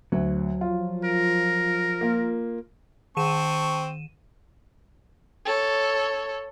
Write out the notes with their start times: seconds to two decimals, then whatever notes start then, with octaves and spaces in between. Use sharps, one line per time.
0.12 D2 F#3
0.61 F3 F4
1.05 A#4
2.01 A#3 F4
3.17 D#3 C4 A5 C#6 D#7 E7
5.45 A4 C#5